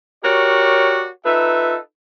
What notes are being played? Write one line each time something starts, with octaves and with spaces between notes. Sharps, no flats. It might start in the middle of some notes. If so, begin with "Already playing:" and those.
F#4 G4 A#4 C#5 D5
D#4 F4 A4 B4 E5